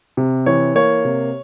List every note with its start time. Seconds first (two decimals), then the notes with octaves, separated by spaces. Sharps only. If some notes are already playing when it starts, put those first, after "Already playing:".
0.17 C3
0.46 E3 C#5
0.75 A#3 C#5
1.05 C3